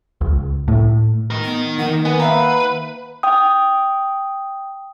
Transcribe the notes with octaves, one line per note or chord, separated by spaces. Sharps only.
C#2
A2
D#4 A#4
B3
D#3 A#3 F#5
B3 G#5
B4 E5 F5 A#5
G5 D#6